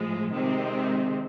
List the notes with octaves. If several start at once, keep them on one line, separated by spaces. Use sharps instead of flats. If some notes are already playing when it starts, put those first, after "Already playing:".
Already playing: A2 F3 G#3
C3 D#3 G#3 C4